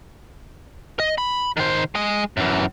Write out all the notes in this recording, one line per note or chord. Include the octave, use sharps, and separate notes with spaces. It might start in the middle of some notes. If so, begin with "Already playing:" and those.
D#5
B5
D#3 C5
G#3 D#5
F#2 E3